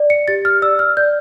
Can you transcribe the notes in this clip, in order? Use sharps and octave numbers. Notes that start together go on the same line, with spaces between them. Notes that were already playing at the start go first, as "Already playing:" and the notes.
Already playing: D5
C#7
G4 A6
F6
D5 E6
F6
D5 G6